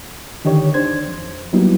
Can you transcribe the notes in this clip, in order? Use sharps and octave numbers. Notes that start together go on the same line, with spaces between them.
D3 D#3 D#4 G4 C#5
D4 C5 G#6
F2
F#3 G3 A#3 B3 D#4 E4